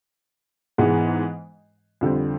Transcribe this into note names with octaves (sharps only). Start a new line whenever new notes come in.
G#2 E3 G#3 B3
F2 D3 G3 C4